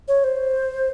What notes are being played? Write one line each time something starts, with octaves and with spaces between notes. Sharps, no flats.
C#5
C5